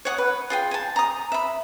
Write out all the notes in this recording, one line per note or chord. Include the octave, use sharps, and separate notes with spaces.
C#5 F#5 D#6
B4
F4 G#4 G5
G#5 A5
A#5 D#6
E5 B5